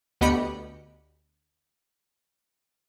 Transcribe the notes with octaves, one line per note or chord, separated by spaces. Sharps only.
D2 B3 G4 D#5 B5 C#7